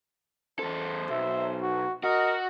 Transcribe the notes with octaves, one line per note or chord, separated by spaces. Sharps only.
E2 A4 C5
B1 E5
F#4
F#4 A#4 D#5